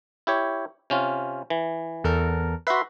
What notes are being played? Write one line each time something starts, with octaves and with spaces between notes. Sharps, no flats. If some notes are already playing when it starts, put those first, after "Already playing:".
E4 G4 C#5
C3 C#4 F4
E3
E2 A4 A#4
F#4 B4 E5 C6